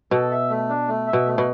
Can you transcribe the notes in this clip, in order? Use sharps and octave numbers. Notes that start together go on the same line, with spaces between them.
B2 A4
E5
A3
D4
A3
E5
B2
A3
B2